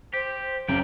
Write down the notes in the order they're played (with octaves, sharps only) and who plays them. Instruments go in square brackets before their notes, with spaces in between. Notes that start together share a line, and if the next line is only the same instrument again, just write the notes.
[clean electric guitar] G4 [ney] C5
[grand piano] F#1 [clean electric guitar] E2 A#3 G5